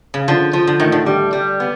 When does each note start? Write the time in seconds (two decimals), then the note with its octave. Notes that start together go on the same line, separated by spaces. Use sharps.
0.14 C#3
0.28 D3 F3
0.53 F3
0.67 D3
0.80 A2 D#3
0.92 D3
1.06 G3
1.33 G3
1.60 B3